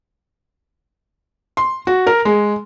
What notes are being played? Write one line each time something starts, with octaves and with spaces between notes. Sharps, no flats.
C6
F#4
A#4
G#3